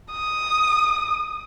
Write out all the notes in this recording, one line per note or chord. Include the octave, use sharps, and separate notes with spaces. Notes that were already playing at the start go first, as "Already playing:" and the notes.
D#6